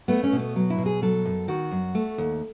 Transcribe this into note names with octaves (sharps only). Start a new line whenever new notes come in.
A3 B3
C#4
B2
B3
F#3
E4
B2
G#4
F#3 A4
F#2
D#3 F#4
F#2
A3
D#2